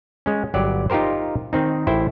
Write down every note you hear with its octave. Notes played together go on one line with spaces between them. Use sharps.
G#3 C#4
G1 F#3 G4 D5
D#4 F4 G4 A#4 C5
D#3 C4 D#4
A1 E4 C5 G5